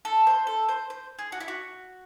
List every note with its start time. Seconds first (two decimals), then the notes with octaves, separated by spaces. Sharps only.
0.05 A4
0.27 C5
0.47 A4
0.69 C5
0.90 C5
1.19 G#4
1.32 F#4
1.40 E4
1.48 F#4